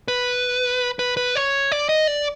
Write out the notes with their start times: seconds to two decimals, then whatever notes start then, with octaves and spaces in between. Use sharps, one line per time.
0.08 B4
0.99 B4
1.17 B4
1.36 C#5
1.72 D5
1.89 D#5
2.08 D5